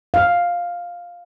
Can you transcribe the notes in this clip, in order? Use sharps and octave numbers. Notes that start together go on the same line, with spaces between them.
F5